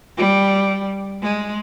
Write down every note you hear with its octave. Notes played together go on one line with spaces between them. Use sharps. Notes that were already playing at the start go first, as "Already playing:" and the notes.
G3
G#3